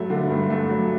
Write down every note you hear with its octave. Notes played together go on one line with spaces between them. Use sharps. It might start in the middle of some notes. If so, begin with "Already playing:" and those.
Already playing: G2 F#3 A3
D3
G2
A3
F#3